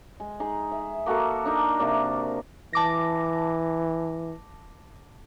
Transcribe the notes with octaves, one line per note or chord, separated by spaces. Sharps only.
G#3
D#4 G#4
E5
A#3 F#4 A4 A#4
D4 D#4 A#4
C3 A#3 D5
E3 A5 D6 A#6